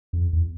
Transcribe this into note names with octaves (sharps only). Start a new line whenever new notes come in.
F2
E2